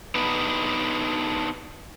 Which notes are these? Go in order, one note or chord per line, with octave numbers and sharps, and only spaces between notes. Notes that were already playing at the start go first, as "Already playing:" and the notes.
B3 D4 D#4 B4